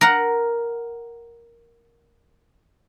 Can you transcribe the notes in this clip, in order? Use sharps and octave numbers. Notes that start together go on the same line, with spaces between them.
A#4 F#5